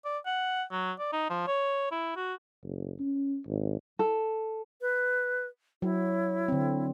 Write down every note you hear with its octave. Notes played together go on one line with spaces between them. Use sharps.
D5
F#5
F#3
D5
D#4
F3
C#5
E4
F#4
F#1
C#4
G#1
A4
B4
F#3 E4
D3 C4